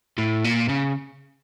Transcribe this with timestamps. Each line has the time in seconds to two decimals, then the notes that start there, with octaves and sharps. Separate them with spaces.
0.18 A2
0.45 A#2
0.69 C#3